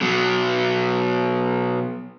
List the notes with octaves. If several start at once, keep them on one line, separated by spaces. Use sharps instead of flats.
B2 F#3